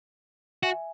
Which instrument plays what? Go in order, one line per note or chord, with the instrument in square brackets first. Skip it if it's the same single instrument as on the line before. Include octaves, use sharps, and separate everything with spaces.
[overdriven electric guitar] F#4 [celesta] E5 G#5